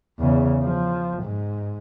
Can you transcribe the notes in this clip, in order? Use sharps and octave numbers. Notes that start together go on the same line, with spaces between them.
E2 C#3
F3
G#2